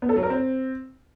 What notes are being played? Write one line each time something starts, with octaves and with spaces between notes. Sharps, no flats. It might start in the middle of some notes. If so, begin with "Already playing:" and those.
B3
A4
F#3
A#4
C4